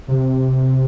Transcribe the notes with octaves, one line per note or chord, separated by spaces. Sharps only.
C3